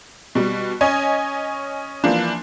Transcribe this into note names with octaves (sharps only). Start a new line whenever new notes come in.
B2 G3
C#4 C#5 D#5 G#5
E3 F3 A#3 D4